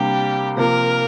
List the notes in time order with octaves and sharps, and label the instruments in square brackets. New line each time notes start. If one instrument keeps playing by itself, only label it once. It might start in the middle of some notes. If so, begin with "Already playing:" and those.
Already playing: [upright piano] C3 G3 A#3 D4 [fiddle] G4
[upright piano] C3 F3 A#3 [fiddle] A#4